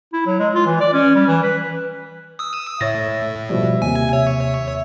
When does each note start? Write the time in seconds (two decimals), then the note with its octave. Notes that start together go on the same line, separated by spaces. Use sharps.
0.13 E4
0.26 F#3
0.39 G#3
0.54 F4
0.66 E3
0.81 D5
0.93 C#4
1.15 G3
1.27 E3
1.43 B4
2.39 D#6 E6
2.81 A2 C#5 E5 A6 A#6
3.50 B2 F3 G3
3.82 D#2 C3 G#5
4.13 C#5 E5